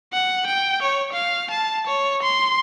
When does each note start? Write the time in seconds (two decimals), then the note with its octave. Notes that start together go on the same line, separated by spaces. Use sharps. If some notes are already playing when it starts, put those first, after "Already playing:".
0.13 F#5
0.47 G5
0.82 C#5
1.12 F5
1.50 A5
1.87 C#5
2.22 C6